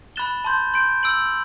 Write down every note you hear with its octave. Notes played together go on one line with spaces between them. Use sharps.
B5 F#6 A6 E7 G7
A5 C6 G6
C6 G6 D7
E6 G6 D7 F#7